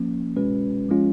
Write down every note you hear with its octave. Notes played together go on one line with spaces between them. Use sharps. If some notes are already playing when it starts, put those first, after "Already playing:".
Already playing: F3 A#3 C#4
B2 G#3 C#4 F#4 B4
F3 G#3 C#4 F4